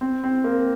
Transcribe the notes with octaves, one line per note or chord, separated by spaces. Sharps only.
C4
C4
A#3